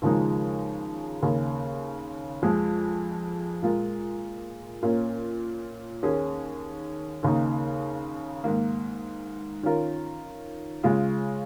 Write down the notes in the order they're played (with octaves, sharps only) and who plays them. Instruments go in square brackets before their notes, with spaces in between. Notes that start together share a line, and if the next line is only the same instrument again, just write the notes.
[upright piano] D#2 C#3 F3 G#3 D#4
D#2 C#3 A#3 C#4
F2 F3 G#3
A#2 G#3 F4 A#4
A#2 A#3 C#4
D#2 D#3 C#4 G#4
D#2 C#3 A#3 D#4
G#2 D#3 A#3
D#3 C#4 F4 A#4
C#3 G#3 F4